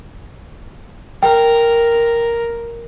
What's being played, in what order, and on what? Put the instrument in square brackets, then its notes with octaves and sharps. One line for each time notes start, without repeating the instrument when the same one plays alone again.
[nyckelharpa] A#4 [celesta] G5